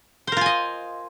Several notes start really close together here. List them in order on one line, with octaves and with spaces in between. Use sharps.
C5 A#4 F4 G#5 D#5